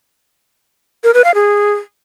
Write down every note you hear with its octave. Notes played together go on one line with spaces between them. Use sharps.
A#4
B4
F5
G#4